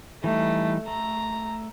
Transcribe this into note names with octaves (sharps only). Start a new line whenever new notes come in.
E3 G3 A3 D#4
A3 A#5